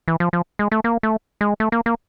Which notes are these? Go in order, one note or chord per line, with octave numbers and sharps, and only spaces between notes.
E3
F3
F3
G#3
A3
A#3
A3
G#3
A3
A#3
A#3